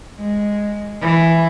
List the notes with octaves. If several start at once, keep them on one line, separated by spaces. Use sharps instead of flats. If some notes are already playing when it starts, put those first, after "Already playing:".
G#3
E3